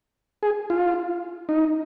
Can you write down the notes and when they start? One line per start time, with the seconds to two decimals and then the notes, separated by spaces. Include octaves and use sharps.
0.43 G#4
0.70 F4
1.49 D#4